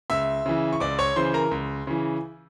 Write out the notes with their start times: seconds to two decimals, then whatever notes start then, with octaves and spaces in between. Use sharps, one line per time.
0.10 C#2 E5 E6
0.46 C#3 E3
0.73 C#6
0.80 C#2 D5 D6
0.99 C#5 C#6
1.16 C#3 E3 C5 C6
1.34 A#4 A#5
1.51 C#2
1.87 C#3 E3